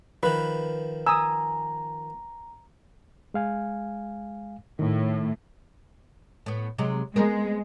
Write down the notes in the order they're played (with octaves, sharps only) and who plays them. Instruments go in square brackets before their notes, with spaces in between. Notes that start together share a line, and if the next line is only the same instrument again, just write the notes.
[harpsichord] D#3 F3 [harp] B4
[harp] G#5 [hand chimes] A#5 [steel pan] D#6 E6
[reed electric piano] G#3 F5 G#5
[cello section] A2 [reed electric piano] D#3
[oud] A2 B3
C3 F#3 G#3
[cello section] G#3 [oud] B3 C4 A#4